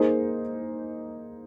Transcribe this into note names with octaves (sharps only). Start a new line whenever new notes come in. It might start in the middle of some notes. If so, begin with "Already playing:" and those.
Already playing: A#3 D#4 G#4 C5